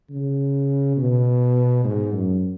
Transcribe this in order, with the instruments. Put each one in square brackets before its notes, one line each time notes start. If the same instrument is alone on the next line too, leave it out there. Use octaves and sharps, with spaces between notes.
[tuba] C#3
B2
G#2
F#2